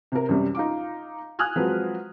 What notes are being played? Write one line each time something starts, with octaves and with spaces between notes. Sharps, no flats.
C3 A#4
F#2 C3 G3
D#4 F4 F5 D6
G#5 D#6 F6 F#6 G#6
F3 F#3 G#3 C4 B4